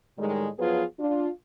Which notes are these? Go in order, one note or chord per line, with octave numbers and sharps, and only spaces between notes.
A2 D#3 G3 G#3
F3 F#3 B3 F4 G#4 B4
D4 F4